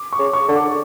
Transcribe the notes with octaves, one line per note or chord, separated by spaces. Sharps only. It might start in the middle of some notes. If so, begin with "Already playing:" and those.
Already playing: D6
C#6
C#3
C#6
D3
D6